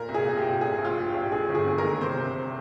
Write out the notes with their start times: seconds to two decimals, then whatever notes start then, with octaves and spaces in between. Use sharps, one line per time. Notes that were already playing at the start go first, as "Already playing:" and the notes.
Already playing: A#2 A#4
0.09 C2
0.14 G#4
0.26 A#2
0.37 G4
0.43 C2
0.61 A#2 G#4
0.78 A#1
0.85 F4
0.96 A#2
1.08 G4
1.14 A#1
1.31 G2 G#4
1.49 G1
1.55 G#4
1.66 G1
1.78 A#4
1.84 D#3
2.01 C3 C5
2.19 C2